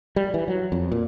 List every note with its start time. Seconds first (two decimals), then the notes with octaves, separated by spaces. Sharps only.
0.16 G3
0.34 E3
0.48 F#3
0.72 F2
0.92 A#2